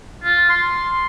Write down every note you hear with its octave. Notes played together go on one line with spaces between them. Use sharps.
F4
C6